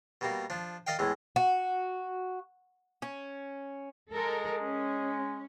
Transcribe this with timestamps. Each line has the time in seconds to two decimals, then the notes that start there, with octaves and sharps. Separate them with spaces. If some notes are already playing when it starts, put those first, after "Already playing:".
0.21 B2 G3 A#3
0.50 F3 D4
0.87 A#4 D5 D#5 F5 G5
0.99 E2 A2 G#3
1.36 F#4
3.02 C#4
4.12 G#3 A4 A#4
4.61 C#4